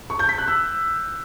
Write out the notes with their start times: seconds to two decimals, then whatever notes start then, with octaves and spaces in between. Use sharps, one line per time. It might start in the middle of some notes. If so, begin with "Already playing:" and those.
0.10 C#6
0.19 G6
0.29 B6
0.38 F#6
0.48 E6